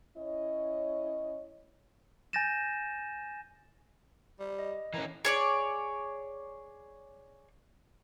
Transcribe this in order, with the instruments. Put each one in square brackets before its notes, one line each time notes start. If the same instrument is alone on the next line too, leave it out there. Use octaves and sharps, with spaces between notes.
[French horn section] C#4 E4 C#5 D#5
[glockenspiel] G#5 G6 A6 A#6 D#7 E7
[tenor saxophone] G3
[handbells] D#5
[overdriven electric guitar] E3 C#4 [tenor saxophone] A#4
[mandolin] G#4 C#5 D5